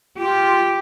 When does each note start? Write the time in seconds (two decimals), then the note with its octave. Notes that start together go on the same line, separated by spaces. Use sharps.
0.19 F4 G4